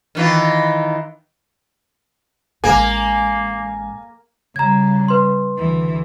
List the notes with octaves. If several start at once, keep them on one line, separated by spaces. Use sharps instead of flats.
D#3 E3 F4
A1 G#3 A#3 G#5
C#3 G3 A#5 G#6
B4 C6
D2 E3